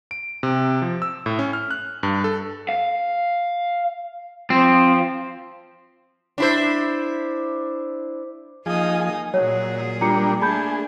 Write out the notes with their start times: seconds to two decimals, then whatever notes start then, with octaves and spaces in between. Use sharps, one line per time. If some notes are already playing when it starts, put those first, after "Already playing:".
0.11 D7
0.43 C3
0.82 F3
1.02 E6
1.26 A2
1.39 C#4
1.53 F6
1.71 F#6
2.03 G2
2.24 A4
2.69 F5
4.50 F3 C4
6.38 D4 E4 C5
8.66 F3 A#3 D#4 G#4 D#5
9.01 G#5
9.34 A#2 F#3 G#4 C#5
10.01 G3 A#3 D4 F4 A#5 C#7
10.41 A3 A#3 D4 G#4 A5 B5 G6